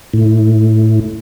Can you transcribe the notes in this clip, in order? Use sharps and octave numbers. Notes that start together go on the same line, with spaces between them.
A2